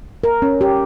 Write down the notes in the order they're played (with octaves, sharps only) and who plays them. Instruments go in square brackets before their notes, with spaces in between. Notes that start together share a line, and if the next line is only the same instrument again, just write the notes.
[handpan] A#4
C#4
G4